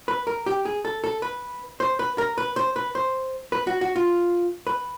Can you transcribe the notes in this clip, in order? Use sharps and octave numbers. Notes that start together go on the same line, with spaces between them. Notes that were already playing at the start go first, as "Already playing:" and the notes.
B4
A#4
G4
G#4
A4
A4
B4
C5
B4
A#4
B4
C5
B4
C5
B4
F#4
F#4
F4
B4